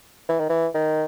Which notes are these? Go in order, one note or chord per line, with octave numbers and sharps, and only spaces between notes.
E3
D#3
E3
D#3